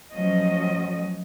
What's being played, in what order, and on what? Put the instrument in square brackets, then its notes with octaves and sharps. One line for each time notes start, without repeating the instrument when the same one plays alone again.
[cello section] F3 F#3 A3 C#4 D#5